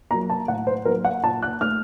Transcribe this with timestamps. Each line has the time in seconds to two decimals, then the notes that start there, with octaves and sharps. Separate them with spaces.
0.11 F#3 A#3 A#5
0.30 A5
0.48 A2 F#5
0.67 C5
0.85 F#3 A#3 A#4
1.05 F#5
1.23 A#2 A5
1.42 F#6
1.61 A3 F6